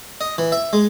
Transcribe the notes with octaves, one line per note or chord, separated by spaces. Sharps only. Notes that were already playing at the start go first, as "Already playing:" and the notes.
D#5
E3
E5
G#3